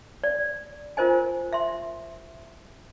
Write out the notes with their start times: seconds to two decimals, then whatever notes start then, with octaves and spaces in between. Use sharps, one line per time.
0.24 D5
0.97 F4 A#4 C5 D#5 G#5
1.53 E5 C6